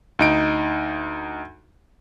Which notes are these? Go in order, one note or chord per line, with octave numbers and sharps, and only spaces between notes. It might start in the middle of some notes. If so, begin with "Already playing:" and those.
D2 D#4 D7